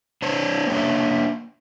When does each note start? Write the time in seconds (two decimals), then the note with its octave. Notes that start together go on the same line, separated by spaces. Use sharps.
0.22 D4 C5 C#5
0.67 A#3 D4 C#5 E5